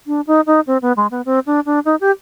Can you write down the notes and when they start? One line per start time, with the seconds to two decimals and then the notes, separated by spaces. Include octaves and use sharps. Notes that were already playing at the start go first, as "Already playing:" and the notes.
0.07 D4
0.27 D#4
0.47 D#4
0.67 C4
0.82 B3
0.97 G#3
1.11 B3
1.26 C4
1.46 D4
1.66 D4
1.85 D#4
2.01 G4